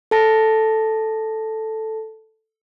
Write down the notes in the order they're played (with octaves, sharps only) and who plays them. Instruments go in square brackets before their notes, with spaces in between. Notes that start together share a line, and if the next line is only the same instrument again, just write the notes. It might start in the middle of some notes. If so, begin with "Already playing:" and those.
[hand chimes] A4 A5 A#6